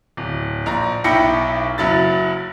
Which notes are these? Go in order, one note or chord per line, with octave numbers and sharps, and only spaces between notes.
D1
A#1 A#5
B1 E4 G5 A#6 C#7
F#1 F#3 E4 A6